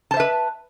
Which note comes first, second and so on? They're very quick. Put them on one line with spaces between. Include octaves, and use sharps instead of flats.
A5 C5 E5 B4